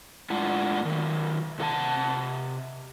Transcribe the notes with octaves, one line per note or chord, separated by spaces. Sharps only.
A2 G#3 D4 F4 F#5
D#3 F#3
C3 F#4 A#4 F#5 A5